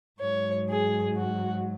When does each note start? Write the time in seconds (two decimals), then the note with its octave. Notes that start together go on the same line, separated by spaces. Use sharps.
0.20 G#2 F#3 C#5
0.69 G#4
1.17 F#4